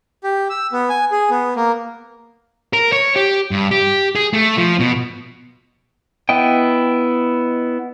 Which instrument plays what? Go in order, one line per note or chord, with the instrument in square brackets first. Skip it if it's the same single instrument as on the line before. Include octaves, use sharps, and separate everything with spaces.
[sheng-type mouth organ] G4
E6
B3
G#5
G#4
B3
A#3
[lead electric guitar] A#4
C#5
G4
G2
G4
G#4
A3
F3
B2
[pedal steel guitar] B3 E4 D#5 G5